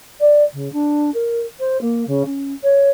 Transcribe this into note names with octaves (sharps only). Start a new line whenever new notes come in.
D5
C#3
D4
A#4
C5
A#3
C#3
C#4
C#5